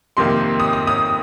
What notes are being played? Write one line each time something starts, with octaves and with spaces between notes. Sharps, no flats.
F2 C3 D#3 A#3 C6
D#6
D#6
D#6